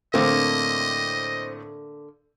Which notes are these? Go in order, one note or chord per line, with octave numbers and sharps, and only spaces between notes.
A2 D3 A3 A#3 C4 D#5